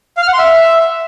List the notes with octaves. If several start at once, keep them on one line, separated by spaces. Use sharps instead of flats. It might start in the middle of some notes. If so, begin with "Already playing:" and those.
F5
F6
F#5
C6
E5